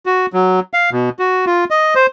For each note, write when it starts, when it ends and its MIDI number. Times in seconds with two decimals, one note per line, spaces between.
0.06 0.26 66
0.33 0.60 54
0.73 0.90 77
0.91 1.10 47
1.19 1.45 66
1.46 1.65 65
1.70 1.94 75
1.95 2.06 72